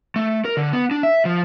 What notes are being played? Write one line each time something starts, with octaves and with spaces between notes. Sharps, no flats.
A3
A#4
D3
B3
D4
E5
F3